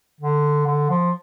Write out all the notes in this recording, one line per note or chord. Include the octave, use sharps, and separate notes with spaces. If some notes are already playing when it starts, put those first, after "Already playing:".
D3
D3
F3